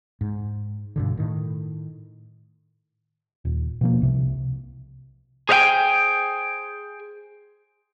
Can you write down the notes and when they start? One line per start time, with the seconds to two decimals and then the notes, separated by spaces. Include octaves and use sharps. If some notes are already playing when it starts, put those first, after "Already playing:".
0.21 G#2
0.96 G2 B2 D3
1.17 A2 D#3
3.45 D#1
3.81 B2 F3 A#3
4.02 C2 C3
5.49 G#4 C5 D#5 F5 G5 G#5